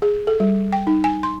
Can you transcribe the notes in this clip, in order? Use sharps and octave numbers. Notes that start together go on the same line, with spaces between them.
G#4
A4
G3
G5
D#4
G#5
C6